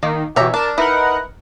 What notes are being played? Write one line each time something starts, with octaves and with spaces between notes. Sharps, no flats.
D#3 A#3
B2 E3 G4 C#5 E5 A#5
D4 A#4 A5
D#4 E4 A#4 B4 F#5